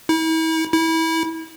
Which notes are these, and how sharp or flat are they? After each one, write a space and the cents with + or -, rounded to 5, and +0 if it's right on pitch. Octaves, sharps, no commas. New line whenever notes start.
E4 -40
E4 -25